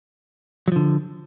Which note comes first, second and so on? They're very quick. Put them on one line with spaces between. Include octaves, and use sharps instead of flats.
F#3 F3 D3